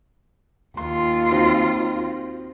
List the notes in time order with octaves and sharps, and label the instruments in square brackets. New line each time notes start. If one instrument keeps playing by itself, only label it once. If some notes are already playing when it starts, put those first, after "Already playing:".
[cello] D#2 F4 [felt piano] C6
[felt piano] C4 D#4 F#4